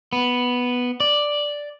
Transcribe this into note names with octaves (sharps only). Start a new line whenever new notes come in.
B3
D5